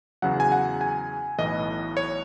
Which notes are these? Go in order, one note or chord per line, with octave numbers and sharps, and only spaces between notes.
E2 C#3 F#3 F#5
G#5
F#5
G#5
B1 A2 E3 D#5
C#5